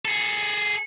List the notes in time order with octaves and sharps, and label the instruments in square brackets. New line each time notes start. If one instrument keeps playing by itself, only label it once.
[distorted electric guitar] G#4 A4